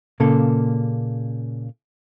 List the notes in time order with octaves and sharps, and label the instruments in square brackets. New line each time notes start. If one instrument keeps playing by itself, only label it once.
[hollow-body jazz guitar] A#2 C#3 A#3 A4